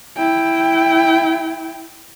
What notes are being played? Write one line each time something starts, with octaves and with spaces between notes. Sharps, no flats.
E4 G5